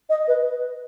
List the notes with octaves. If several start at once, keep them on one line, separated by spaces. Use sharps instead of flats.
D#5
B4